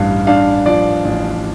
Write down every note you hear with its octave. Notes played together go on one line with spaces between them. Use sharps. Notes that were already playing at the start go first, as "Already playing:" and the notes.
Already playing: A1 G2 F5
D4 F5
F3 D5
A1